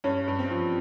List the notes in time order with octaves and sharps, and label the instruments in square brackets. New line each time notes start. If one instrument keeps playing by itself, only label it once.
[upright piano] G2 [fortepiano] C#4
[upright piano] G2
[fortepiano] C4
[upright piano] F3